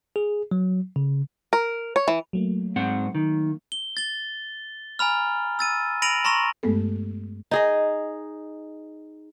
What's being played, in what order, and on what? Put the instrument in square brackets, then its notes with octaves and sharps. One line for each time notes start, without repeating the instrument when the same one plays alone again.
[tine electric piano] G#4
F#3
C#3
[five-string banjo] A#4
C#5
E3
[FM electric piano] F#3 A3 A#3
[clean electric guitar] G#2 C4 F#5
D#3
[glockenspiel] G7
A6 G7
G#5 A#5 B5 F6
E6 A6 D#7
B5 A#6 D7 D#7 F7 F#7
A#5 C6 C#6 A#6 F7
[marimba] G2 G#3 A3 B3 A4
[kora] D#4 G#4 D#5